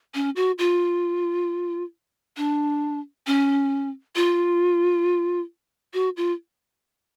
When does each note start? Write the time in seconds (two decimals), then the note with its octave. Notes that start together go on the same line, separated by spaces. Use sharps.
0.14 C#4
0.36 F#4
0.58 F4
2.37 D4
3.27 C#4
4.16 F4
5.94 F#4
6.17 F4